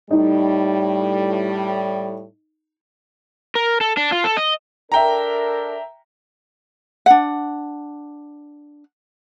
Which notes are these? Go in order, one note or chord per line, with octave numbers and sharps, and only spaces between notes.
A2 G3 D#4
A#4
A4
D4
F4
A4
D#5
D4 A4 A#4 E5 G5 A#5
D4 F#5